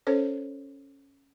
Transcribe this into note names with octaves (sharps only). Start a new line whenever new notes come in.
C#4 A4 C5 C#5